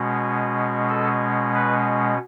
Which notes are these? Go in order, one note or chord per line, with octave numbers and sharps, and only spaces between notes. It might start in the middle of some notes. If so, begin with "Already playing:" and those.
Already playing: B2 G#3 C#4
A4
B4